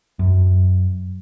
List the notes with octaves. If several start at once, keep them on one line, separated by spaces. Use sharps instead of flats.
F#2